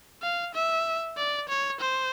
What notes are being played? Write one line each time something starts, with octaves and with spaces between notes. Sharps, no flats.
F5
E5
D5
C#5
C5